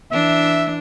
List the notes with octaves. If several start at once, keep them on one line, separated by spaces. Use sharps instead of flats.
E3 D4 E5